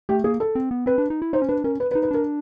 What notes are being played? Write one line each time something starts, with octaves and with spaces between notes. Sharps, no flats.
A3 G4
A#3 G#4
A4
C4
B3
C4 B4
D4
D#4
E4
D#4 C5
C#4
D4 B4
C#4 A#4
B4
B4
D#4
B4
D4 A#4